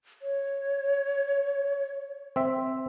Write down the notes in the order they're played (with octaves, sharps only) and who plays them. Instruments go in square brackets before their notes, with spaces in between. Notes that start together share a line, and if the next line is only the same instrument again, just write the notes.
[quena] C#5
[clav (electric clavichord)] C4 E5